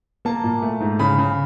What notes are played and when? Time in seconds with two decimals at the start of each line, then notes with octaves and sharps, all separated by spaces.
0.25 A#3 A5
0.44 A#2
0.62 A3
0.80 G#2
0.99 C#3 B5
1.18 C#3